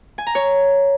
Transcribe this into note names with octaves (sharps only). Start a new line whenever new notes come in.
G#5
A#5
C#5